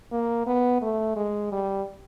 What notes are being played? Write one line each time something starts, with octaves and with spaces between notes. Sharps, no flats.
A#3
B3
A3
G#3
G3